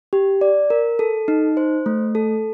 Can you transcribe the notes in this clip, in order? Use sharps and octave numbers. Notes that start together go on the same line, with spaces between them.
G4
D5
A#4
A4
D#4
C5
A3
A4